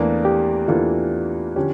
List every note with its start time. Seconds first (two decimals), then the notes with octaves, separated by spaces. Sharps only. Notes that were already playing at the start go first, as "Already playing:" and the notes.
Already playing: E2 E3 A3 A#3 D4 A4
0.25 G4
0.68 E2 E3 A#3 D4 F4 A4
1.56 D3 F3 C#4 G4